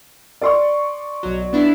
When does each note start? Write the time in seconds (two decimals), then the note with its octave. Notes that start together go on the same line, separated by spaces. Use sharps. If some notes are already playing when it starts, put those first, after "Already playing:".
0.41 D5 C6 C#6
1.23 B1 F#3
1.53 B3 D4 E4